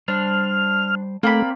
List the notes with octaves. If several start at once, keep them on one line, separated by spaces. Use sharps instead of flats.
G3 D4 C5 F6
A3 A#3 C4 D5 G5 B5